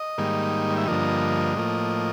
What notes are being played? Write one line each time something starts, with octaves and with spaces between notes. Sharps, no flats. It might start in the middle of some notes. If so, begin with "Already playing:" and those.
Already playing: D#5
G#2 D#3 G3 A#3
E5
G2 D3 F3 A#3 D#5
A2 F3 A#3